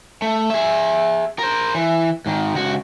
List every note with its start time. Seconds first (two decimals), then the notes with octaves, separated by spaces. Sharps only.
0.22 A3
0.50 G#4 E5
1.39 A#4 C5
1.75 E3
2.26 G#2 D#3
2.55 C#2 F#4